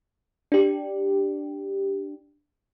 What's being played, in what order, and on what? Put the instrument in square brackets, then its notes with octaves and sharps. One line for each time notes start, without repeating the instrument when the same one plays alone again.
[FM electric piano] D4 G4